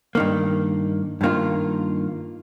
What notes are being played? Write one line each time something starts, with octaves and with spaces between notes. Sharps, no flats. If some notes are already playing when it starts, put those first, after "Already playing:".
G2 D#3 A#3
G2 D#3 A#3 F4